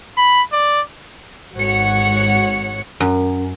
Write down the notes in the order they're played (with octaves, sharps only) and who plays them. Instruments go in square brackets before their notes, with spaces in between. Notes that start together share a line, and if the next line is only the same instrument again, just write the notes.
[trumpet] B5
D5
[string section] G#1 G#2 F#4 C#5 F#5 C#7
[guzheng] F#2